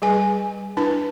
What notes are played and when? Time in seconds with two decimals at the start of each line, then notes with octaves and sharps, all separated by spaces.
0.02 G3 G#4 B4 G#5
0.77 D4 E4 B4 A5